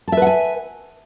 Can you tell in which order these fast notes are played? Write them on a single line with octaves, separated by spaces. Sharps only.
A5 E5 B4 F#5 G#5